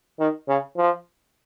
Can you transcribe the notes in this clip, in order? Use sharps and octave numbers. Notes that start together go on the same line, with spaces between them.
D#3
C#3
F3